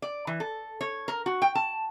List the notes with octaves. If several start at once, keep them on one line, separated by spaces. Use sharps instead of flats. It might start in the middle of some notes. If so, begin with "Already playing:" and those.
D5
E3
A4
C#5
A#4
F#4
G5
A5